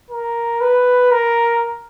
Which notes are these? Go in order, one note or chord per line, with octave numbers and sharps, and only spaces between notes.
A#4
B4
A#4